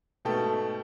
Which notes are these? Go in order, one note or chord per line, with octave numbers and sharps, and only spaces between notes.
G#2 B2 A3 A4 G5